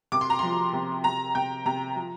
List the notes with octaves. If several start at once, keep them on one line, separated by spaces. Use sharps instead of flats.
C3 D6
C6
A#5
F3 C6
C3
C3 A#5
C3 G5
C3 A#5
F3